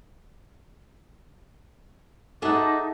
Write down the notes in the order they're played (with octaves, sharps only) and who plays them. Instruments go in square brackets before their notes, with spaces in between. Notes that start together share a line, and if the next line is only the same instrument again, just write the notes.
[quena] D#4 [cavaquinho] G#4 E5 A5 [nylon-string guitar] A4 F#5 [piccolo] D6